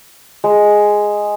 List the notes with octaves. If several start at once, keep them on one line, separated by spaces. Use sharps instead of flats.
G#3